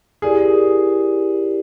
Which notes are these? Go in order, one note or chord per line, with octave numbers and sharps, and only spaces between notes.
E4 G4 G#4 A#4 D5